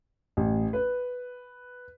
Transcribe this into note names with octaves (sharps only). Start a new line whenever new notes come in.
A1
B4